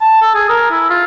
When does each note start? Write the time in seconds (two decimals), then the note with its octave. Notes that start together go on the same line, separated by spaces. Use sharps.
0.01 A5
0.22 A4
0.35 G#4
0.49 A#4
0.71 E4
0.90 F4